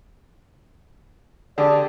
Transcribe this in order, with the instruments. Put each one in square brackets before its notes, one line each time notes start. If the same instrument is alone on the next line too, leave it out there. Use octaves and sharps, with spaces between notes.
[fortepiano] D3 [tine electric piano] G4 G#4 [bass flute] D5